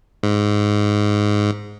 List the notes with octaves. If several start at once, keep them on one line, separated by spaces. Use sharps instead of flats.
G#2